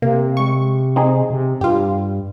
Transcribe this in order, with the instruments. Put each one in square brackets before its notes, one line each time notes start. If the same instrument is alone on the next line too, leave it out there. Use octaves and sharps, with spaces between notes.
[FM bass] C3 [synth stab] A#3
[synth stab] G#3 C#6
C4 D#4 G#4
[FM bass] C3
[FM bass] G2 [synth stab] F4 G4